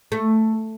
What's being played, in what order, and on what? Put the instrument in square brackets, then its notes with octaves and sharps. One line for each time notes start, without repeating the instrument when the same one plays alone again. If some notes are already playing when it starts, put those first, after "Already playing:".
[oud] A3